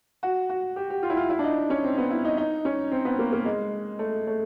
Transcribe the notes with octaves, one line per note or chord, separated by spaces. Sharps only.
F#4
F#4
G4
G4
F4
E4
F4
E4
D4
D#4
C#4
C4
B3
E4
D#4
D#4
C#4
C4
B3
A#3
A#3
G#3
A3
A3